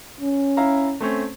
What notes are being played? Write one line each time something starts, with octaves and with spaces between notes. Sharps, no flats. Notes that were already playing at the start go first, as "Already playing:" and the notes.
C#4
E4 F5 A#5
A3 C4 C#4